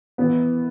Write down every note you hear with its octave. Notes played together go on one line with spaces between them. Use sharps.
E3 B3 E4